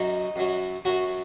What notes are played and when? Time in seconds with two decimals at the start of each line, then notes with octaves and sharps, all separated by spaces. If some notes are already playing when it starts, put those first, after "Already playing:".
Already playing: F#2 F#3 D#4
0.36 F#2 F#3
0.85 F#2 F#3 F#4